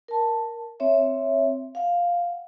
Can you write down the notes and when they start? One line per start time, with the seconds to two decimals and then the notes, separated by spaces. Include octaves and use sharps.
0.08 A#4 A5
0.80 C4 C#5 E5
1.75 F5 F#5